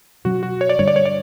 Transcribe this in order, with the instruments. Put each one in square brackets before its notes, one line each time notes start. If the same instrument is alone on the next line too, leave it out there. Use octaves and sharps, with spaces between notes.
[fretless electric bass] B2 F#3 C#4 [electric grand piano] F#4
[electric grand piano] F#4
C#5
D5
[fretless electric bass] G2 D3 G3 D4 [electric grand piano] C#5
[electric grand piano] D5
C#5
D5